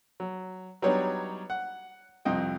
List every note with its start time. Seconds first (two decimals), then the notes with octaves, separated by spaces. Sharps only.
0.20 F#3
0.82 F#3 G3 B3 D4 D#4 C#5
1.50 F#5
2.25 C2 F2 D#5 G5